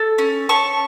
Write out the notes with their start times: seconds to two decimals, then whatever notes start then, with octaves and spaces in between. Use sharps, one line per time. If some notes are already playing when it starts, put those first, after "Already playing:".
Already playing: A4
0.18 C#4
0.49 C#4 A5 C#6